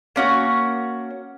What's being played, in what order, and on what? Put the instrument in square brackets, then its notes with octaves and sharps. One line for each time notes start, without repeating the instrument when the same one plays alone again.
[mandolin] A#3 C#4 F#4